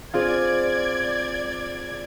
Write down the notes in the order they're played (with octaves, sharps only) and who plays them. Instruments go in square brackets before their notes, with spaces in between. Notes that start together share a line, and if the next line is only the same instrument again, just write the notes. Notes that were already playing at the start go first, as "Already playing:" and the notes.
[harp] C4 F4 G#4 [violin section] D5 G#6